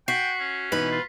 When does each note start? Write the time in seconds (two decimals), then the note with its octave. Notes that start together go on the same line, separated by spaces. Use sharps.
0.08 F#4 G5 B6 C7
0.40 C#4
0.72 B2 E3 D#4 B4
0.92 F4